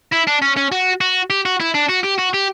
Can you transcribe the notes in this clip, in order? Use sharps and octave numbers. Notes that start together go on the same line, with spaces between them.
E4
D4
C#4
C#4
F#4
F#4
G4
F#4
E4
D4
F#4
G4
F#4
G4